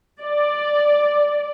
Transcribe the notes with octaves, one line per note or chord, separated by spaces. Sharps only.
D5